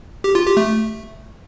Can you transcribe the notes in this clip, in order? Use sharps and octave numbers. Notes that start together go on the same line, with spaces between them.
G4
F4
G4
A3